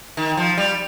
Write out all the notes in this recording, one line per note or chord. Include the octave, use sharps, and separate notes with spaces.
D#3
F3
G3